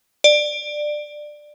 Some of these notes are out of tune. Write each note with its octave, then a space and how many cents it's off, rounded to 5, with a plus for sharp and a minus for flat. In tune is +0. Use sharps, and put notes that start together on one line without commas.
D5 +15